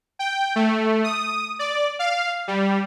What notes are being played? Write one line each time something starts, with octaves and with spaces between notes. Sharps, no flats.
G5
A3
D#6
D5
F5
G3